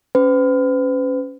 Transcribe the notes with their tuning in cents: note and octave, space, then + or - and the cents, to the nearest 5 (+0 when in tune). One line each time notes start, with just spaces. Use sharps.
C#4 +0 B4 +45